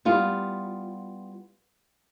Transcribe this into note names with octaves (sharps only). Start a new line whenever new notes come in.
G3 B3 F4